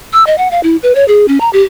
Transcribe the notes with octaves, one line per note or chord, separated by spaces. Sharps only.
E6
D#5
F#5
F5
E4
B4
C#5
G#4
C#4
A#5
G4